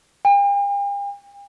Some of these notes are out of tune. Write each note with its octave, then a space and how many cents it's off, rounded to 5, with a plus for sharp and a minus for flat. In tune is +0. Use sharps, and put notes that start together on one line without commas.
G5 +45